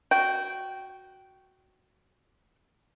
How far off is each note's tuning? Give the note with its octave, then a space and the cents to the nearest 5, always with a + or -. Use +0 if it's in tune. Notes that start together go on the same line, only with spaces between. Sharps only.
F#4 +0 G5 -15